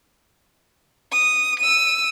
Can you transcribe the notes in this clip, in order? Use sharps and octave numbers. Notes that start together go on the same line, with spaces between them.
D#6
E6 D#7